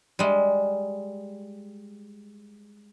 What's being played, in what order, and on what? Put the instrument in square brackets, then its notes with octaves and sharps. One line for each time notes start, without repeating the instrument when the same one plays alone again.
[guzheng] G3 G#3